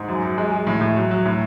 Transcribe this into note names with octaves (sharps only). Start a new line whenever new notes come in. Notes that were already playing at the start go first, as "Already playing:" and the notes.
Already playing: G#2
F#2
F#2
G#3
G#3
A2
A2
F#3
F#3
A2